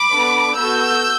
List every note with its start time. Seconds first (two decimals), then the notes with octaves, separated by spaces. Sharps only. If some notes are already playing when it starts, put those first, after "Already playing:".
Already playing: B5 D6
0.11 B3 D4 A4
0.57 B3 F#4 A4 E6 G6